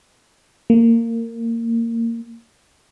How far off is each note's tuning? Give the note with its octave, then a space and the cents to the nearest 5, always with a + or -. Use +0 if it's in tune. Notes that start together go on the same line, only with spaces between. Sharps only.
A#3 -20